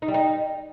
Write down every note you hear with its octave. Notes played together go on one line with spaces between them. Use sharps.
D#4
G3
D#4